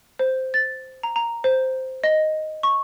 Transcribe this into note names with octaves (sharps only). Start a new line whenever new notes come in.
C5
A6
A#5
A#5
C5
D#5
C#6